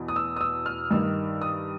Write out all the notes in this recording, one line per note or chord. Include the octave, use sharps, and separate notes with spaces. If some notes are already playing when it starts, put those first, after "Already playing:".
Already playing: E2 B2
D#6
E6
D#6
E6
F6
G2 D#3 G3 E6
D#6